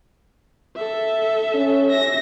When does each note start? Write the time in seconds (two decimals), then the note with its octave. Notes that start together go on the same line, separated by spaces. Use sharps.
0.76 A4 E5
1.54 C#4
1.89 E5 A#6